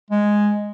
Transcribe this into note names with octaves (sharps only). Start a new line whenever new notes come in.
G#3